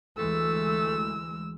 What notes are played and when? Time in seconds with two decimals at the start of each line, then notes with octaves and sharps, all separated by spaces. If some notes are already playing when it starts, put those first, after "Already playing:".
0.18 D2 E3 G#3 A3 E6